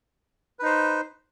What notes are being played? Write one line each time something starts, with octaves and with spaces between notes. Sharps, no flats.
D#4 B4 C5